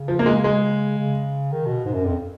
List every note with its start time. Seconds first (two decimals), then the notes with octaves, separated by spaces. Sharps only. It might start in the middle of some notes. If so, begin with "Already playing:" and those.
Already playing: C#3
0.08 F3
0.19 A#3
0.26 G#3
0.44 G#3
0.98 C#3
1.52 D#3
1.66 B2
1.86 G#2
1.93 F#2
2.06 F2